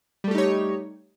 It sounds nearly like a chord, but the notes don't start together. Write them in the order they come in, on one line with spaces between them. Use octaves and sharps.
G3 A3 G4 D#4 C#5